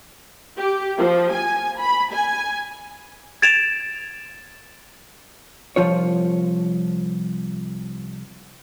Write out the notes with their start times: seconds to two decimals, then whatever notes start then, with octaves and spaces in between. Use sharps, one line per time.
0.58 G4
0.98 F3
1.32 G#5
1.79 B5
2.12 G#5
3.42 G#6 A6 D7 E7 F7
5.76 C2 B2 F3 F4 C#5